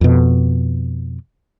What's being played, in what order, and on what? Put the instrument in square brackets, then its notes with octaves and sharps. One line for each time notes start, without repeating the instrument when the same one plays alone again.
[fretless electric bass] F2 B2